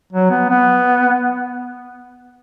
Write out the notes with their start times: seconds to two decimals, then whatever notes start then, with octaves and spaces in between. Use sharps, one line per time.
0.13 F#3
0.30 B3
0.49 B3